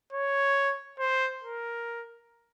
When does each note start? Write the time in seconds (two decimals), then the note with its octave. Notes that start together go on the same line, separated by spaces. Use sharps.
0.13 C#5
0.99 C5
1.44 A#4